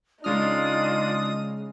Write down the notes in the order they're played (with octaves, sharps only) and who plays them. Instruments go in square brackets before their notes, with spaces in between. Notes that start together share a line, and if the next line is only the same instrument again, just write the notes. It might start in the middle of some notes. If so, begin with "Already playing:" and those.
[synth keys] C#3 G#3 F6 [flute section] D4 F4 [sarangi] D#4 [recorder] D#6